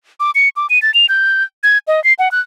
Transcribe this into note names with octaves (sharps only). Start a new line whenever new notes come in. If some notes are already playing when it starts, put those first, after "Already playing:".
D6
C#7
D6
D#7
A6
F7
G6
G#6
D#5
C7
F#5
F#6